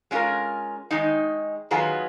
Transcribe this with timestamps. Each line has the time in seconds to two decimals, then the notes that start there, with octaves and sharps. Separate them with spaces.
0.11 G#3 C#4 F4 A#4
0.91 D#3 G#3 D#4
1.71 D#3 F#3 B3 F4 G#4